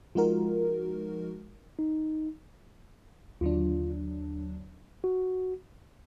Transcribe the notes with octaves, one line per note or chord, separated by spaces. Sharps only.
F3 G#3 D#4 F4 F#4 A#4
D#4
D#2 D3 F#3 D4 F4
F#4